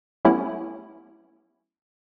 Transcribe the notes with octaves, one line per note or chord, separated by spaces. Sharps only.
F#3 A3 B3 C#4 E4 G4